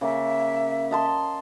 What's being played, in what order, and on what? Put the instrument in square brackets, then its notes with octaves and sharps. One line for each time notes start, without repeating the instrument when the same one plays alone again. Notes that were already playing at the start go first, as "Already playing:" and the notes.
[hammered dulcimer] C#3 A#3 [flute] E5
[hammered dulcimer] D#5 A5 C6